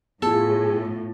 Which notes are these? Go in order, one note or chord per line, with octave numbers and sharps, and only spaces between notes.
A2 B3 F4 G#4 A4